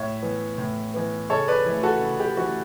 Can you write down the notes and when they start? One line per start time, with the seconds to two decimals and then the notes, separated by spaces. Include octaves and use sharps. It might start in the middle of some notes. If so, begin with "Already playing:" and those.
Already playing: A2 C#5 E5
0.22 E3 B3
0.58 A2
0.94 E3 B3
1.30 C#3 A4 C#5
1.48 B4 D5
1.66 E3 A3
1.83 F#4 A4
2.02 C#3
2.19 G4
2.37 E3 A3 F#4